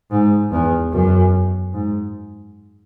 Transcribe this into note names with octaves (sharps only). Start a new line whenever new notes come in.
G#2
E2
F#2
G#2